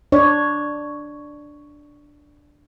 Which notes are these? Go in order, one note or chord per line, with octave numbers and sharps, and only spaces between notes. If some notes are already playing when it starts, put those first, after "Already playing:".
D4 C#5 D5